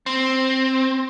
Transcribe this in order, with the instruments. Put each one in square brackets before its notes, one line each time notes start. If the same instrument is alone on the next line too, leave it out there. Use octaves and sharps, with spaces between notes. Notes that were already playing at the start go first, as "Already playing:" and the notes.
[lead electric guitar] C4